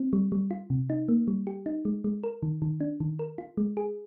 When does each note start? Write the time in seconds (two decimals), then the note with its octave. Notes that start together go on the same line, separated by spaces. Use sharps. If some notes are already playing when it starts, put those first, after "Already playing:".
Already playing: C4
0.13 G3
0.32 G3
0.51 F4
0.70 C3
0.90 D#4
1.08 A#3
1.28 G3
1.47 G4
1.66 D#4
1.85 G#3
2.04 G#3
2.23 A#4
2.43 D#3
2.62 D#3
2.80 D4
3.00 D#3
3.19 A#4
3.38 F4
3.57 G#3
3.77 G#4